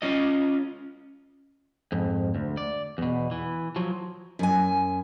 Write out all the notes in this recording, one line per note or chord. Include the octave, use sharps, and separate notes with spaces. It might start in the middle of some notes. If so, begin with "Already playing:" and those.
C#4 F4 C#5 D#5
F2 G#2
D2
D5
E2 B2
E3
F3 F#3
F#2 G#5